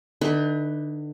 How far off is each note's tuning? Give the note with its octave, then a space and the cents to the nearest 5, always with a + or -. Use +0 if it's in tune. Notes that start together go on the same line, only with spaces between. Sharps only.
D3 +30 D#4 +40 B4 +0